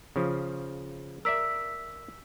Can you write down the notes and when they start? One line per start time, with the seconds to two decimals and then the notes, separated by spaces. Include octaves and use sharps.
0.16 C#3 F3
1.25 A#4 D5 E5 E6 B6